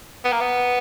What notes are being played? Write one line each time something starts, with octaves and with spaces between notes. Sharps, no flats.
B3
A#3
B3